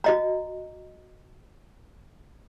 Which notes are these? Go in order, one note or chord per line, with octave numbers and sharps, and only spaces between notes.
F#4 D#5 A#5